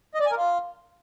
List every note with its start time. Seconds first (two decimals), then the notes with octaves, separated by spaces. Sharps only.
0.14 D#5
0.20 D5
0.26 G#5
0.31 A#4
0.37 F4